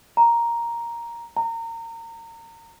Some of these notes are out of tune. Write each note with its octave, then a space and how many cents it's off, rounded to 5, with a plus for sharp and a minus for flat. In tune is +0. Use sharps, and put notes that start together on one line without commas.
A#5 +5
A#5 -30